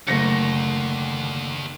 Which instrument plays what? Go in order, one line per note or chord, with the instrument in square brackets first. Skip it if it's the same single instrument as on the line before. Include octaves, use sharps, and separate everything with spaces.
[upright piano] F#1 A#6 C#7 [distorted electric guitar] D#2 [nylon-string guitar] D3 A3